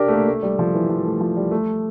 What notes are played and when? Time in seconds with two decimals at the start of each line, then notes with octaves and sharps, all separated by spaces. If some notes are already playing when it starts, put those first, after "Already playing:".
Already playing: D4 G4 A#4
0.08 A3
0.13 A#3
0.28 A3
0.43 G3
0.59 F3
0.74 E3
0.90 F3
1.05 A3
1.21 F3
1.36 G3
1.51 A3